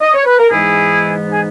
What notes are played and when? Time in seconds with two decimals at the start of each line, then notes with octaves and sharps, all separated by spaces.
0.00 D#5
0.13 C#5
0.25 B4
0.38 A#4
0.49 G#2 E3 G#3 B3 D#4 E4 G#4
1.30 G#4